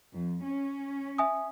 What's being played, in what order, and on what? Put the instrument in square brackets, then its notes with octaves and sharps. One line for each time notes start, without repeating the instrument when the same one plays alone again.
[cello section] F2
C#4
[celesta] E5 G#5 D#6